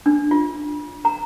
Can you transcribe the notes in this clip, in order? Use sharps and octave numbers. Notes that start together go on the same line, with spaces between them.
D4
F4
A#5